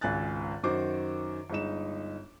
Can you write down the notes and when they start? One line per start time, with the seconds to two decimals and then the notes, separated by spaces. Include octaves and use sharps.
0.01 G#1 C#2 G#5 F#6 A6
0.63 F#2 D#3 F#4 C5 D6
1.50 G1 G#3 D#4 E7